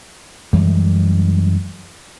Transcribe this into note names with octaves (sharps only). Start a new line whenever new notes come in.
F#2 E3 G3 G#3